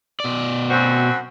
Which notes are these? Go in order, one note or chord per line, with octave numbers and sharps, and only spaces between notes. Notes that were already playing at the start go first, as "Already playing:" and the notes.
B2 D5
F#2 C4 F#4